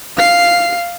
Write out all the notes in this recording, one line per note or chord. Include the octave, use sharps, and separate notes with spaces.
F5 C7